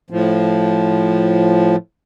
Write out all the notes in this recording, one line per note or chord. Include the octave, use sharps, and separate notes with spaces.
A2 F3